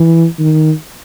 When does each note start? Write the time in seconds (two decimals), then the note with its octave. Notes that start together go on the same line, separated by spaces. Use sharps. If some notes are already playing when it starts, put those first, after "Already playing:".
Already playing: E3
0.39 D#3